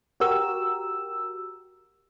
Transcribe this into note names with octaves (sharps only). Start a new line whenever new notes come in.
F#4 G4 A#4 E6